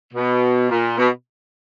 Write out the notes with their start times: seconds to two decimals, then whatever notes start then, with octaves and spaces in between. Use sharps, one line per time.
0.13 B2
0.70 A#2
0.97 B2